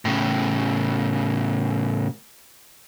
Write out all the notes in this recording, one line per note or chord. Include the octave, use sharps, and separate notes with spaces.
A2 C#3